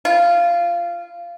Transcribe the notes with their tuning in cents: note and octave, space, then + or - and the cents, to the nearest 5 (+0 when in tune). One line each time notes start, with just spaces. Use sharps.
F4 -15